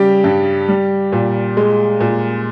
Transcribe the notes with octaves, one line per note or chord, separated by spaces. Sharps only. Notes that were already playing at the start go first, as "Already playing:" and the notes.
Already playing: C#3 G3 G4
G2
G3
A#2
G#3
A#2